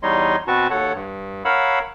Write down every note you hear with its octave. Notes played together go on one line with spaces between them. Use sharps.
E2 G3 D#4 C#5 D#5 C6
B2 C4 F#4 B4 A5 C#6
D#2 A4 C#5 F#5
G2
A#4 C#5 F5 F#5 B5 E6